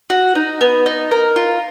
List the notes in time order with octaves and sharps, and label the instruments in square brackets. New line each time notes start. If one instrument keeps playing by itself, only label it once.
[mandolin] F#4
D#4
B3
D#4
A#4
F4